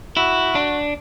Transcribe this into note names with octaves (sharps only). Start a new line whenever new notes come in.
E4 F#4
D4